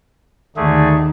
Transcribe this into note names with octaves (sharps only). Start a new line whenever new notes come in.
D#2 D3 D#3 A3 G#4